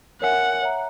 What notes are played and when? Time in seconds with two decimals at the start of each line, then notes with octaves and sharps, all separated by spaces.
0.22 A#4 C#5 E5 F#5 G#5
0.62 C#5 E5 A#5